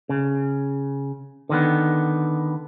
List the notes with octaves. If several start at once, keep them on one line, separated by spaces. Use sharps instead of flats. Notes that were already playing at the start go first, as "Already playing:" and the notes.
C#3
D3 D#3 B3